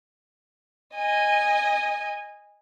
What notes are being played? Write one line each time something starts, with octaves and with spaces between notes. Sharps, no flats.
D#5 G#5